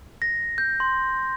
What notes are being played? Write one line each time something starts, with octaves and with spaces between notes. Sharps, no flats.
A#6
G6
C6